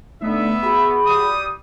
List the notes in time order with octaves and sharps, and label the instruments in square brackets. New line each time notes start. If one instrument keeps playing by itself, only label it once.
[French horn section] D3 D#4 [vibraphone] A3 [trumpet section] B3 E5
[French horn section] F#4 G#4 [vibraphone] B5
[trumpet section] G3 D#6